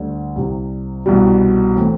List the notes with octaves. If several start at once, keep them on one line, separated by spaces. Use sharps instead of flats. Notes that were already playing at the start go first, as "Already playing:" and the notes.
Already playing: D2 D3 G3
C2 C3 G3
C2 B2 G3
A2 E3 A3 C4